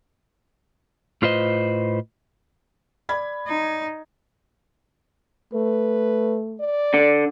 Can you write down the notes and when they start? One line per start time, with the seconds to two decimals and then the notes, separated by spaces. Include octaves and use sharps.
1.22 A2 F4 B4 C5 D#5
3.09 D5 B5 G#6
3.47 D#4
5.53 A3 B4
6.60 D5
6.94 D3